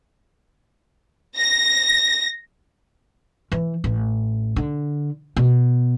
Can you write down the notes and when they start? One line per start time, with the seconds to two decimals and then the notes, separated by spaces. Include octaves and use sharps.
1.37 A#6
3.52 E3
3.84 A1
4.56 D3
5.36 B2